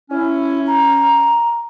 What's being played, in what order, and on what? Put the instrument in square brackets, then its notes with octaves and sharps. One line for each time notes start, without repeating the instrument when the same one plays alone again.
[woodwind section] C#4 [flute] E4
[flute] A#5